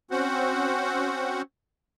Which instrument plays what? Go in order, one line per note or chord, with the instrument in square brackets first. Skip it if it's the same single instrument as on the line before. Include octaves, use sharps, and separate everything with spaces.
[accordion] C4 C#4 F#4 C5 F#5